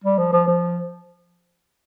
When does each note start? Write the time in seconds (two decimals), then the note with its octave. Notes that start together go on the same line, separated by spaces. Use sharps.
0.04 G3
0.18 F3
0.33 F3
0.48 F3